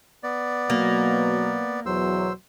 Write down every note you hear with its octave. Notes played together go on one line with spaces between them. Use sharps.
B3 D5
B2 F#3 A#3
E2 B2 F#3 C5 E6